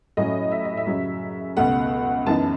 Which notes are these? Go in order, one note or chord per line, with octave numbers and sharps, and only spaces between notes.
A2 F#3 C#4 D#5
E5
D#5
E5
F#2 C#3 F#3
C#2 B2 A3 F#5
F#2 E3 B3 D#4 A5